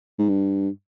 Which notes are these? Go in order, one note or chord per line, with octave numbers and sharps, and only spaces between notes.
G#2
G2